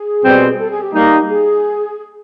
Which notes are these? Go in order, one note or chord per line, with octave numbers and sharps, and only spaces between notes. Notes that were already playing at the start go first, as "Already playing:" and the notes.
Already playing: G#4
B2 G3 C4
A4
G#4
G4
G3 A#3 D#4
G#4